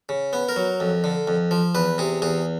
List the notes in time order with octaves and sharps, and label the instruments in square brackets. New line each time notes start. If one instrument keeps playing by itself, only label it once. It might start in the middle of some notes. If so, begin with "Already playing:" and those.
[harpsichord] C#3
B3
A#4
F#3
F2
D3
F2
F3
E2 B4
C3 G#4
E2 G#4